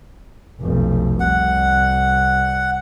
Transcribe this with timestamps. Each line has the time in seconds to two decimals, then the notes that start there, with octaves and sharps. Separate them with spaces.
0.61 F1 B1
1.20 C2 F#5